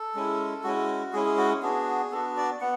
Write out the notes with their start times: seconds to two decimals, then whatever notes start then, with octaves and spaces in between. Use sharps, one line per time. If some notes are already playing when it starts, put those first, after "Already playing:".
Already playing: A4
0.15 G#3 C#4 E4
0.64 G#3 C#4 E4 F#4
1.13 G#3 C#4 E4 G#4
1.26 G#4
1.37 F#4
1.62 B3 D4 F#4 G#4
2.11 B3 D4 F#4 A4
2.37 D5
2.61 B3 F#5